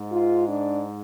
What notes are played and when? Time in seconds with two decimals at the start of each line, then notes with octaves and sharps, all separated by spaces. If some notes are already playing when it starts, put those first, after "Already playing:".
Already playing: G#2
0.11 F4
0.49 D4